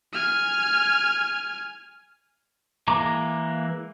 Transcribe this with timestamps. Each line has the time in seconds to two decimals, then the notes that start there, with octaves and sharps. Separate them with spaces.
0.13 G#5 F6
2.88 E3 G#3 A#3 A#5 D6